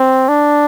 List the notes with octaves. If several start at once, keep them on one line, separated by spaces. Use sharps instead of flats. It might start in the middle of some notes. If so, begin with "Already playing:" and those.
Already playing: C4
D4